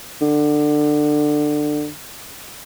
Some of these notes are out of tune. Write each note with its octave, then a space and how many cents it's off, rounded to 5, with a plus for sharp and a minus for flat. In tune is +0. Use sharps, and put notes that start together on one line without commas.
D3 +20